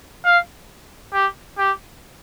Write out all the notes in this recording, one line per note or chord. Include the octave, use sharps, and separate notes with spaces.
F5
G4
G4